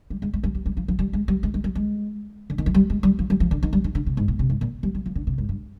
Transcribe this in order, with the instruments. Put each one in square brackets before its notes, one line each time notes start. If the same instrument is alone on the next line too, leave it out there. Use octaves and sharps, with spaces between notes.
[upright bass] G3
G#3
G#3
G3
G3
G3
F3
F3
G3
G#3
G3
G#3
G#3
G3
G#3
D3
D#3
F3
G3
G#3
G3
F3
G3
F3
D3
D#3
G3
D#3
D3
C3
G#2
A#2
C3
G#2
A#2
G3
G3
F3
D3
C3
G#2
G2